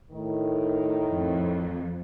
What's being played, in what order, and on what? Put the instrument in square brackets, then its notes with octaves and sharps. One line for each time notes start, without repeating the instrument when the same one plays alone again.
[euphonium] A2 [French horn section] D#3
[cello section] F2